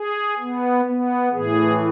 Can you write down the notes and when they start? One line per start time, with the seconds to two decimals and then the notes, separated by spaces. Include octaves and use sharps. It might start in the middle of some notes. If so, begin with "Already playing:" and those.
Already playing: G#4
0.39 B3
0.86 B3
1.32 A2 E3 G#4